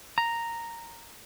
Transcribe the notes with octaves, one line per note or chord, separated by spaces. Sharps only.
A#5